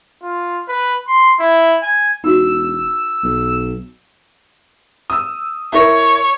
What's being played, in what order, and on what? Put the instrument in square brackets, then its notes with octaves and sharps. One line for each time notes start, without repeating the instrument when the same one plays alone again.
[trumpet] F4
B4
C6
E4
G#5
[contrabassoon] E1 [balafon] D#4 F#4 [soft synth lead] E6
[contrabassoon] B1
[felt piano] D#6 E6
[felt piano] E4 A#4 [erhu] C#5